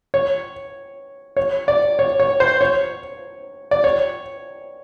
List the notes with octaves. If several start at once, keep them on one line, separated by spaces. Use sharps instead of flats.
C#5
C#5
D5
C#5
C#5
C5
C#5
D5
C#5